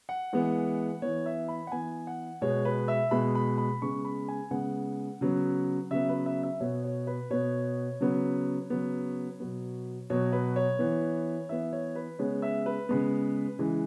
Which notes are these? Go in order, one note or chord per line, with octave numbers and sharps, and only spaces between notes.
F#5
E3 G#3 B3
E3 B3 C#5
E5
B5
F#5
E3 B3 G#5
F#5
B2 G#3 B3 C#5
B4
E5
B2 G#3 B3 B5
B5
B5
C#3 G#3 B3 C#6
B5
G#5
C#3 G#3 B3 F#5
C#3 F#3 B3
C#3 F#3 B3 E5
B4
E5
E5
B2 B3 C#5
C#5
B4
B2 B3 C#5
C#3 F#3 B3
C#3 F#3 B3
B2 F#3 B3
B2 F#3 B3 C#5
B4
C#5
E3 B3
E3 B3 E5
C#5
B4
C#3 G#3 B3 C#5
E5
B4
C#3 G#3 B3
C#3 E3 G#3